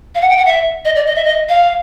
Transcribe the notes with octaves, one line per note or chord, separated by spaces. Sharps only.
F5
F#5
G5
F#5
E5
D#5
D5
D#5
E5
D#5
F5